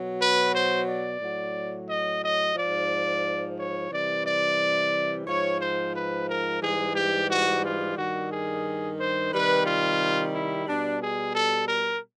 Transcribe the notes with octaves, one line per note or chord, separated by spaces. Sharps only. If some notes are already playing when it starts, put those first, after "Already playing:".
Already playing: B2 F#3
B4
C5
D5
A2 F#3
D#5
D#5
F3 D5
G#2
C#5
C3 E3 G3 D5
D5
G#2 F3 C#5
C5
B4
A#4
G#2 E3 G3 G#4
G4
F#4
F4
G2 D#3 G3 F#4
G#4
C5
C3 D#3 G3 B4
F4
E4
B2 G3 D4
G#4
A4
A#4